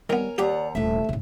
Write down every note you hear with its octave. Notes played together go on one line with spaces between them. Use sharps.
D#3 G3 B3 A#4 C#5 G#5
D#2 G4 D5 F#5 A#5
D#1 C3 A3 D4 E5
G#2 C#3